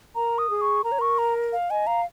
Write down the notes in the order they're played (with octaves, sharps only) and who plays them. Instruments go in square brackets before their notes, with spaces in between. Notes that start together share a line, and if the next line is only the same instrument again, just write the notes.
[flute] A#4 [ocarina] A#5
[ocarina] D#6
[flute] G#4
[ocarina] C#6
[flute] A#4 [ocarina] A#5
[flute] C#5
[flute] A#4 [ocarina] C#6
[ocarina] A#5
F5
[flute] D#5 [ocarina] G#5
[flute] F5 [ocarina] A#5